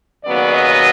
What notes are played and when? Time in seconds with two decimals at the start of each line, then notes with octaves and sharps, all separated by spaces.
0.25 D#2 C#3 F#3 B3 D5
0.54 D#5